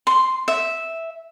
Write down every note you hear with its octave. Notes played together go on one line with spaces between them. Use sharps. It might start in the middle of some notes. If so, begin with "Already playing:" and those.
C6
E5